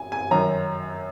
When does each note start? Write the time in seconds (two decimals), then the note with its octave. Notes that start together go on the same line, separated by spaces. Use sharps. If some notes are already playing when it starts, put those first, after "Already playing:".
Already playing: G#5
0.12 G#5
0.31 F#2 D#3 F#3 A#5